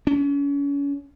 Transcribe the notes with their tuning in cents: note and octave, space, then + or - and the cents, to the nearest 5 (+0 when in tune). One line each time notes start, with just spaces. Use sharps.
C#4 +35